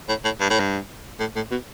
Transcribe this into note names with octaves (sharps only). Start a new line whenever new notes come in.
A2
A2
G2
A2
G2
A2
A2
B2